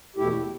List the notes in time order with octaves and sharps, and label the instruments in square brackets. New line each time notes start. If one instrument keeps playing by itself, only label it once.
[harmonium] E2 B2 A3 E4 G4